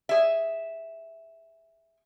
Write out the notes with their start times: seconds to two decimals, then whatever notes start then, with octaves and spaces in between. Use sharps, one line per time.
0.09 G#4 E5